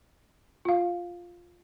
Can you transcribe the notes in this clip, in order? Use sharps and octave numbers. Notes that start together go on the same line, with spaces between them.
F4 F5